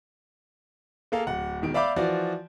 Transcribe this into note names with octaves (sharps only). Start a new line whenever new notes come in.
A#3 G#4 A4 F5
D1 F#5
E1 D#3 D7
D5 E5 F5 B5 D6 G6
E3 F3 F#4 D5